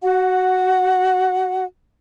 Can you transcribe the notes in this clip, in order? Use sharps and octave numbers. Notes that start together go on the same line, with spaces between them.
F#4 F#5